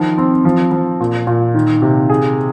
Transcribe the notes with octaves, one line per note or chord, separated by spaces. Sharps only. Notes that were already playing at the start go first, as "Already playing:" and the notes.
Already playing: D#3 F3
C4
F3
F3
A#2
A#2
D#3
C3
G#4